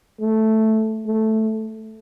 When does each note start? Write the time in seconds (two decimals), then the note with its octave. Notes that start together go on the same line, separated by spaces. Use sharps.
0.21 A3
1.07 A3